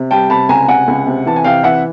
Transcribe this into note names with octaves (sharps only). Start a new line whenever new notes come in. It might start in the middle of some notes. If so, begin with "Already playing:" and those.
Already playing: C3
G3 G5 A5
C3 A5 B5
C#2 G#5 A#5
C3 F#5 G#5
C#2
C3
E3 A5
G#5
C3 F5 G5
E3 E5 F#5